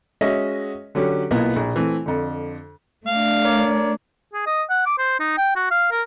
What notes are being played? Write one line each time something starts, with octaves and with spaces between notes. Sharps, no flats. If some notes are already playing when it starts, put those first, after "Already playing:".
G#3 C#4 F#4 D#5 E5
D3 F#3 C#4 G4
B1 A#3 B3 E4 F4
A#1
E3 A3 C4
F2 D3
A3 D4 F5
A#4 C#5 D5
G#4
D#5
F#5
D6
C5
D#4
G5
F#4
F5
A#4